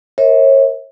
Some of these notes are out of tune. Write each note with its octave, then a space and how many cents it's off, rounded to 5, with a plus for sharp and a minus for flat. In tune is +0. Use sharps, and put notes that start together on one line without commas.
A#4 +0 C#5 -35 E5 -35